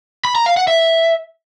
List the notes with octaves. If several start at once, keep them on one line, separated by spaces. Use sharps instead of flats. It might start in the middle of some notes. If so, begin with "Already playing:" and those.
B5
A#5
F5
F#5
E5